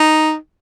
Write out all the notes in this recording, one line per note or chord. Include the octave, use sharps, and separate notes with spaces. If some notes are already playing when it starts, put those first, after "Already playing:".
Already playing: D#4